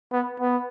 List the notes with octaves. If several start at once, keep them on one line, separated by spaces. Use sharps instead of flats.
B3
B3